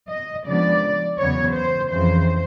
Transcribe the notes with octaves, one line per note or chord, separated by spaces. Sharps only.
D#5
C#3 F3 G#3 B3 D4 D5
E2 C#3 F#3 B3 C#5
C5
F2 C#3 E3 C5